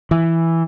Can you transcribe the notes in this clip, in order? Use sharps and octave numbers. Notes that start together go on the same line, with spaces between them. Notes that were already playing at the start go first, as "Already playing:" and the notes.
E3